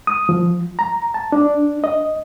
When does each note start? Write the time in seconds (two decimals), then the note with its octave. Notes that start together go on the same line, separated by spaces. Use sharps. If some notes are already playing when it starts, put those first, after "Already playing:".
0.07 D#6
0.29 F3
0.79 A#5
1.14 A5
1.32 D4
1.84 D#5